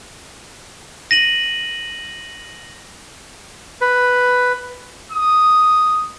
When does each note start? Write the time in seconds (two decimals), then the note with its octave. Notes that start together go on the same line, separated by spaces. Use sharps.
1.11 A#6 D#7 F#7
3.81 B4
5.12 D#6